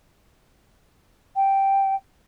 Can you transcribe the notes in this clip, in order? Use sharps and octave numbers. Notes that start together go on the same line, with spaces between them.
G5